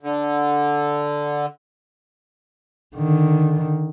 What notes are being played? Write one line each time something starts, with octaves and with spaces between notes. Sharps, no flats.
D3
D3 D#3